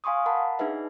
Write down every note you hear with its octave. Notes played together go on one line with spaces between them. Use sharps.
F5 G#5 C6 C#6 D#6
A#4 F#5 A5 B5
D4 D#4 G#4 B4 E5